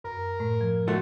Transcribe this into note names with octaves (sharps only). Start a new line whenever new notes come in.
F#2 A#4
A2 A3
F3
A3 F4 F#4